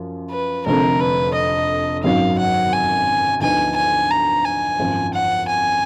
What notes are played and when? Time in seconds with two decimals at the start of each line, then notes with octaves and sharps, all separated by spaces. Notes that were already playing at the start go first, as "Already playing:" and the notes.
Already playing: F#2 F3
0.31 B4
0.66 F1 F2 D3 A#4
1.00 B4
1.35 D#5
2.04 G#1 F#2 D#3 F#3 F5
2.38 F#5
2.72 G#5
3.41 D2 D3 F3 B3 D#4 G#5
3.76 G#5
4.11 A#5
4.45 G#5
4.79 G#1 F#2 F3
5.14 F#5
5.49 G#5